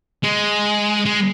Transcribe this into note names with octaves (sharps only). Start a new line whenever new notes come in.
G#3
G#3